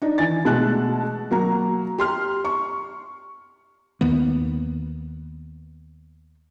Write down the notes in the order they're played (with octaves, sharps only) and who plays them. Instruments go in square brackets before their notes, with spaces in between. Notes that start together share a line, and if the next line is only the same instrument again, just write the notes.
[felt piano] D4 D#4
E3 G#5 A6
B2 G#3 A3 A5 F#6
F#3 A#3 A#5
G4 C6 F6
C#6
[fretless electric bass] D#2 D#3 A#3 B3